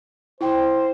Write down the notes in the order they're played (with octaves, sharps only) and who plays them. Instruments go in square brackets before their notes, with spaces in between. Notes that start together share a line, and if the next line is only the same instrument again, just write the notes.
[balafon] E4 G5 [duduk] C5